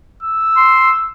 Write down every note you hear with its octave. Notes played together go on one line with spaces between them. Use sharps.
E6
C6